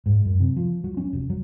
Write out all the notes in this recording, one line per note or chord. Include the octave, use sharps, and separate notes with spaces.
G#2
F#2
C3
F3
F#3
C#4
F1
F#3